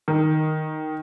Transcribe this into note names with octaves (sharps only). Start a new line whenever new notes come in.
D#3